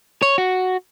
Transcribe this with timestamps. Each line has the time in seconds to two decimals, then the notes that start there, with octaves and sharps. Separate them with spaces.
0.22 C#5
0.38 F#4